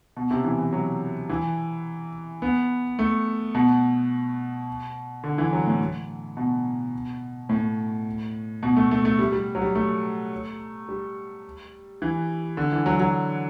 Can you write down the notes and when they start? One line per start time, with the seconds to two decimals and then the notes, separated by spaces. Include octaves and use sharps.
0.17 B2
0.31 C3
0.44 E3
0.59 E3
0.73 F#3
1.29 E3
2.42 B3
2.99 A3
3.55 B2
5.24 D3
5.38 E3
5.53 F#3
5.67 A2
6.37 B2
7.49 A2
8.63 B2
8.76 A3
8.91 A3
9.05 A3
9.19 G3
9.33 G3
9.55 F#3
9.62 G3
9.75 A3
10.89 G3
12.02 E3
12.57 D3
12.72 E3
12.86 F#3
13.00 F#3